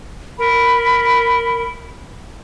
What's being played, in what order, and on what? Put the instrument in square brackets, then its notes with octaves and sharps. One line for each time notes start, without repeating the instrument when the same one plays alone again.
[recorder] A#4 [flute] B5